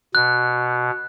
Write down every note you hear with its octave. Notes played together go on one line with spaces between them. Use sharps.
B2 F#6